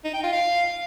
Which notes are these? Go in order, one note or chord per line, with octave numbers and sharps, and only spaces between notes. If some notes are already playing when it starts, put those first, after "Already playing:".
D#4
G5
F4
F5